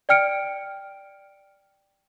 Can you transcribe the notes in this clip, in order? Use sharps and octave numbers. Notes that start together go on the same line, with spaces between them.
D5 G5 F6 C#7 D7